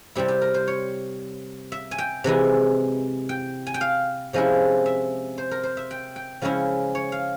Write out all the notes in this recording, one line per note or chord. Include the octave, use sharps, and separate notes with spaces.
C3 G3 C4 E4 G4
G4
A#4
C5
C#5
E5
G#5
G5
C3 E3 G#3 E4
G5
G#5
G5
F5
C3 F3 G#3 C#4 E4
E5
C5
A#4
C5
E5
G5
G5
C#3 F3 G#3 C#4 E4 E5
C#5
F5